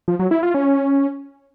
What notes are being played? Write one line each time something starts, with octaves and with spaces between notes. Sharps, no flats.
F3
F#3
E4
F4
C#4